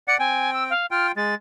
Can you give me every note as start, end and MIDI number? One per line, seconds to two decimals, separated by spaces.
0.08 0.17 74
0.08 0.17 78
0.08 0.17 97
0.19 0.73 60
0.19 0.73 79
0.19 0.51 80
0.53 0.64 88
0.70 0.86 77
0.91 1.12 65
0.91 1.12 79
0.91 1.07 89
1.16 1.35 56
1.16 1.34 93